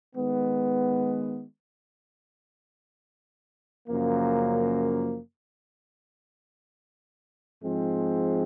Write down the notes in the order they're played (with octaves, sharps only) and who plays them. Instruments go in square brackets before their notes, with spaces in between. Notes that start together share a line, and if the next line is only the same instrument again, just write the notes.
[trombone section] D#3 G#3 B3
F#2 C#3 F3 A#3
G#2 F3 G#3 C4